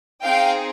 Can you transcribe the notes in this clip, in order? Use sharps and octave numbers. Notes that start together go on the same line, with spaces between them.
C4 D#4 G#4 F5 G5